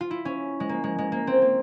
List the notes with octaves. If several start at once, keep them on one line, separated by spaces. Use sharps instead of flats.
F4
E4
C#4
G#3
A#3
G#3
G#3
A#3
C4
A#3